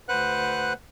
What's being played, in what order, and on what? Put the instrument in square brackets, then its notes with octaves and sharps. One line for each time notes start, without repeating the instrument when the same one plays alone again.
[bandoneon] D2 B4 C5 F#5 F#6